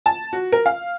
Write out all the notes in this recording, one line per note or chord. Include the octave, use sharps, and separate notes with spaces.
A5
F#4
A#4
F5